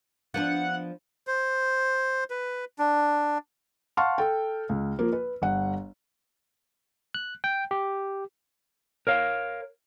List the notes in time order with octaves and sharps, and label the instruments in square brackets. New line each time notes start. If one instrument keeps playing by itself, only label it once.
[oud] F3 B3 D4 [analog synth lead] F#5
[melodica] C5
B4
D4
[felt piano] F5 F#5 A5 C6 C#6 F6
A4 G5
C#2
F3 A#3
B4
G1 F#5
[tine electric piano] F#6
G5
G4
[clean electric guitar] A#4 C#5 F5